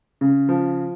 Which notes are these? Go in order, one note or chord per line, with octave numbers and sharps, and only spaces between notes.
C#3
F3